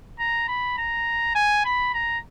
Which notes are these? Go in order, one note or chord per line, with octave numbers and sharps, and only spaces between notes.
A#5
B5
A#5
G#5
B5
A#5